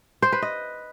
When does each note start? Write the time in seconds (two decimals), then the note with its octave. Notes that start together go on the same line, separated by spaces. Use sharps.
0.22 C5
0.32 B4
0.42 D#5